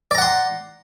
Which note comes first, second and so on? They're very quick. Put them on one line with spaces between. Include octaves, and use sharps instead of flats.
D5 A#5 F#5 C6